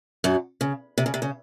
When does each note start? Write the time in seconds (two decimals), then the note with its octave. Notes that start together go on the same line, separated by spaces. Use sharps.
0.24 F#2 F#3
0.61 C#3
0.98 C3
1.06 C#3
1.14 C3
1.22 C#3